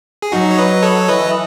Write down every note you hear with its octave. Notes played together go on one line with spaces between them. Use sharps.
G#4
F#3 D#4 F#4
C#5
B4 D#5
A4 C#5
E3 B4 D#5